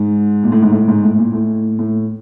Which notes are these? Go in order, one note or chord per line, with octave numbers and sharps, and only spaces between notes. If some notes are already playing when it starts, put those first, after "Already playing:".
Already playing: G#2
A#2
A2
G#2
A2
G#2
A2
A#2
A2
A2